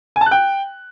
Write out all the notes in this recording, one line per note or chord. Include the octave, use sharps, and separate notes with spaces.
G#5
A5
F#6
G5